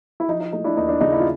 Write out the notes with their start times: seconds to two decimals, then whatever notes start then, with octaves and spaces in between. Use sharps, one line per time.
0.20 E4
0.28 F3 D#4
0.40 D#4
0.52 A3 D#4
0.64 D4 E4
0.77 D#2 D#4
0.89 D4
1.01 C#3 D#4
1.12 E4
1.20 F4